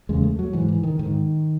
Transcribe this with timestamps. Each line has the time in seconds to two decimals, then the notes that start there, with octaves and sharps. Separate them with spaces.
0.09 E2 C#3 G#3
0.23 A3
0.39 F#3
0.53 G#2 E3
0.69 E3
0.83 D#3
0.99 G#2 D#3